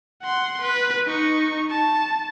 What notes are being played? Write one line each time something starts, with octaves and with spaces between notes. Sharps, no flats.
F#5 C6
B4
D#4 C#6
A5